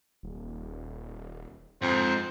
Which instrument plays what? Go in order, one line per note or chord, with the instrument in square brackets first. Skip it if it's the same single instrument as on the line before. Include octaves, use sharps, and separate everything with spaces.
[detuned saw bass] D#1
[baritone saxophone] F2 [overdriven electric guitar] G#2 [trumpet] C5